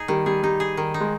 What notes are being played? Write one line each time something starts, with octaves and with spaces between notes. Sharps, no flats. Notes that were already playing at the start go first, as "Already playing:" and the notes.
Already playing: D#4 G#4
D#3 G3
G3 G#4
G3 D#4
G#4
D#3
D#4
G#3